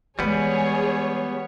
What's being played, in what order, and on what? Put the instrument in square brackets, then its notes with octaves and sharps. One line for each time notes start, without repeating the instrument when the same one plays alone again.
[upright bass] E3 G#3 [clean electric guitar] G3 B3 [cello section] G#4 [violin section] C#5